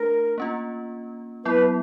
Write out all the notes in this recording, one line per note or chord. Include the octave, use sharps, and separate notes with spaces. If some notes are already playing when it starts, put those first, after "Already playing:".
Already playing: A3 D4 A#4
A#3 C#4 F4
F#3 B3 E4 B4